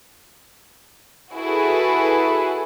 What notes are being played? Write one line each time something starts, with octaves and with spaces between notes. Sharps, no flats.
E4 F#4 G#4 A4 B4